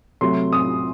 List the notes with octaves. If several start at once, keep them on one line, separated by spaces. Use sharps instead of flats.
C3 F#3 A3 C6
D#6